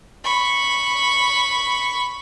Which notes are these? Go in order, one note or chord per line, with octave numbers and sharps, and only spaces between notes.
B5 C#6